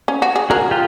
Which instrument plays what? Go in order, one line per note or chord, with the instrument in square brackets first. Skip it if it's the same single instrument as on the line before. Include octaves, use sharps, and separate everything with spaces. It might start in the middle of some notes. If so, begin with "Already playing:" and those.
[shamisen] C#4
F#4
G#4
[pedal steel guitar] F#4 G#4 [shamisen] A#4
[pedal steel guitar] F4 G4